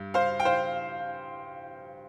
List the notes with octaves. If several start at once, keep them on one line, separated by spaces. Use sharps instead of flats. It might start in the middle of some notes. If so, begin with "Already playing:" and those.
Already playing: G2
C5 F5
G5
C5 F5